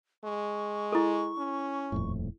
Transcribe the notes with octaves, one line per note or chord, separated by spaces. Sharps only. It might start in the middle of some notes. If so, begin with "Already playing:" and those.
G#3 C#6
E4 A4
C#4
D#1 F2 A2